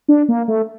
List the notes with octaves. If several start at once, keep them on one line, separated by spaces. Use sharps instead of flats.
D4
A#3
A3